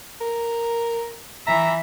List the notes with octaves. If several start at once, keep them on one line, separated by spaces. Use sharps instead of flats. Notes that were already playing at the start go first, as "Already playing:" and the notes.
A#4
E3 E5 A#5